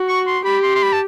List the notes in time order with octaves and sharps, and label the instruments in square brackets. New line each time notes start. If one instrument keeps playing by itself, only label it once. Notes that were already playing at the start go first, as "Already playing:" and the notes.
Already playing: [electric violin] F#4
[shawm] C#6
C6
[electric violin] G4 [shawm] B5
[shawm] C6
C6
B5
A5